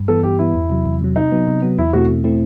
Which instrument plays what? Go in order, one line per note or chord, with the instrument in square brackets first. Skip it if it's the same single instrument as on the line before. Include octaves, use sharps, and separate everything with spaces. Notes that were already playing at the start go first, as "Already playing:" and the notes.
Already playing: [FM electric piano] G2
[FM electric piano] E3 B3 [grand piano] A4
[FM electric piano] G2 [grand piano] G4
[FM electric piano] E3 B3 [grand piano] E4
[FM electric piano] E2
C3 F#3
E2
C3 F#3
[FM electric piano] C3 [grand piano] D#4
[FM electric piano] F#3 B3
C3
F#3 B3
[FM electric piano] E2 [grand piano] E4
[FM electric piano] B2 A3 C4 E4 [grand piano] F#4
[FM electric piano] E2
B2 A3 C4 E4